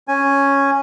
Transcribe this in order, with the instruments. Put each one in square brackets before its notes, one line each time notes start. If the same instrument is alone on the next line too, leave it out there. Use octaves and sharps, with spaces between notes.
[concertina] C#4 G#5